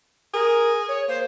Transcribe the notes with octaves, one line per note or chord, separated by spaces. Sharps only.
G#4 A#4
C#5
A#3 C5